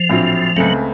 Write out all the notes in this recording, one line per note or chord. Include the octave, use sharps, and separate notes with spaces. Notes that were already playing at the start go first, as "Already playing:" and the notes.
Already playing: F3
A#1 A2 F#3 C4 F4
C#2 C#3 F#3 A3 C4